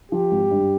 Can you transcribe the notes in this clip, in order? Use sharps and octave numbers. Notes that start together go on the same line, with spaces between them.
F3 G4
G#1
G2